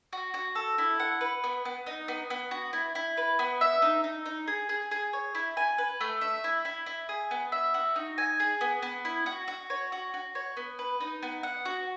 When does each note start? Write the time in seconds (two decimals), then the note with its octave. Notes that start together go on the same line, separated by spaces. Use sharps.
0.13 F#4
0.34 F#4
0.55 A4
0.78 E4
1.00 F#5
1.21 B4
1.44 B3
1.65 B3
1.86 D#4
2.08 B3
2.30 B3
2.51 F#4
2.73 E4
2.95 E4
3.17 B4
3.39 B3
3.61 E5
3.82 D#4
4.04 D#4
4.26 D#4
4.47 G#4
4.69 G#4
4.91 G#4
5.13 C#5
5.35 E4
5.57 G#5
5.78 B4
6.01 A3
6.21 E5
6.44 E4
6.65 E4
6.86 E4
7.09 G#4
7.31 B3
7.52 E5
7.74 F#4
7.96 D#4
8.18 G#5
8.40 G#4
8.61 B3
8.82 B3
9.05 E4
9.26 F#4
9.48 F#4
9.70 C#5
9.92 F#4
10.14 F#4
10.35 C#5
10.57 B3
10.79 B4
11.00 D#4
11.23 B3
11.43 F#5
11.65 F#4